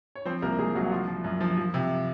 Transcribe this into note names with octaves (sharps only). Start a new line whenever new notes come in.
C#5
F3 C4 C5
C2 A#3 A#4
C2 G#3 G#4
C2 F#3 F#4
F#4
F3 F4
F3
F#2
F3
F3
C3